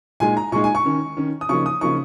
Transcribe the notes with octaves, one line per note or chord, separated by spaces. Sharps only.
A#2 G#3 D#4 G#5
A#5
A#2 G#3 D#4 C#6
G#5
C#6
D#3 C#4
D#3 C#4
D#6
C#3 F3 A#3 D#4 C#6
D#6
C#3 F3 A#3 D#4 C#6